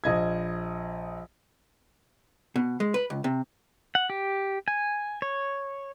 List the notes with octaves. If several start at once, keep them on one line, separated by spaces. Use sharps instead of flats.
A#1 D#5 G#6
B2
G#3
B4
C#2
C3
F#5
G4
G#5
C#5